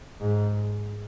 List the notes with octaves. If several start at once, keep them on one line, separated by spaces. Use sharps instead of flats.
G#2